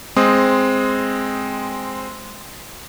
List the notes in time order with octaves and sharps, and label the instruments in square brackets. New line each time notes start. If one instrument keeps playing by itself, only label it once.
[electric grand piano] G#3 C4 D#6